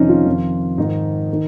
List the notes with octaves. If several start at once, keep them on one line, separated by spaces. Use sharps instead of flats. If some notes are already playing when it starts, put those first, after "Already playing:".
Already playing: F2 C3 D#3 C#4 D#4
F4
F2 D#3
G#2 D#3 D#4
D#3